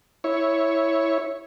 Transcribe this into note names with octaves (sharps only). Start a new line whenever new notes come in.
E4 C#5